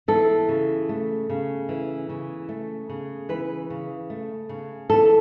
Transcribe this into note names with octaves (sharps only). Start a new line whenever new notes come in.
E3 A4
C#3
A3
C#3
E3
C#3
A3
C#3
E3 B4
C#3
A3
C#3
E3 A4